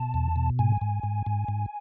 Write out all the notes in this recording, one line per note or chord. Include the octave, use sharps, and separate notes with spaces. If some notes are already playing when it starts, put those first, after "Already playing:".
Already playing: B2 A5
E2
B2
G#2 G#5
G#2
G#2
G#2
G#2